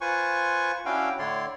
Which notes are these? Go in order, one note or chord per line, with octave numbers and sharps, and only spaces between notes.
F4 B4 C5 G#5 C#6
C#4 D4 E4 F#4 F5 G5
A2 D3 E4 C#5 D5 C6